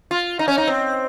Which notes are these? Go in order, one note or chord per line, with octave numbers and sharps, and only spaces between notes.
F4
D#4
C#4
D#4
C4